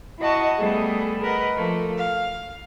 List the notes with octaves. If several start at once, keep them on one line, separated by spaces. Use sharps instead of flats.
E4 F#4 D#5 F#5 A5 C#6
G3 A3 B3 G#4 A4
A#4 B4 D#5 F#5
F3 A3 A#3
F5